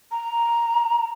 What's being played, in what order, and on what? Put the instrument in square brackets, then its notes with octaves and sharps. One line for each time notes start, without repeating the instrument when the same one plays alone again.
[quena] A#5